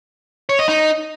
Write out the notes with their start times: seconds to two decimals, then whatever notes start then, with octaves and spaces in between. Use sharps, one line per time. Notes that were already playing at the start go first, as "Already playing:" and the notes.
0.49 C#5
0.59 D#5
0.69 D#4